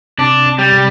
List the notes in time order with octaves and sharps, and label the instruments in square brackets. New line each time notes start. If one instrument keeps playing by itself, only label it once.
[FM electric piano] C3 [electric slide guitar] D4
[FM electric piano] C3
[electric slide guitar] G3
[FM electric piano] C3